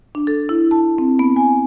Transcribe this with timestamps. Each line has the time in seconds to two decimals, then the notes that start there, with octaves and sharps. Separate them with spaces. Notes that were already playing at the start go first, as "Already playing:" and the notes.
0.15 D4
0.27 A4
0.49 E4
0.71 A5
0.98 C4
1.19 B3
1.36 G#5